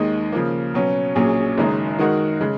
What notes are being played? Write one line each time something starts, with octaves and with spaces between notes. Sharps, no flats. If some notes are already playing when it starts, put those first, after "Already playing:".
Already playing: D#2 D#3 G#3 D#4
C#3 F3 A#3
B2 F#3 C#4
A#1 A#2 F#3 C#4 G#4
F#1 F#2 D#3 G#3 D#4
D#3 G#3 D#4 F#4 A#4
C#3 G#3